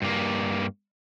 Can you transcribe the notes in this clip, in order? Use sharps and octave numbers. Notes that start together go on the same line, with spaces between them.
G2 A#3